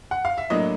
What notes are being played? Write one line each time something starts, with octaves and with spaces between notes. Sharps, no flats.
F#5
F5
E5
A2 F#3 A#3 D4 D#5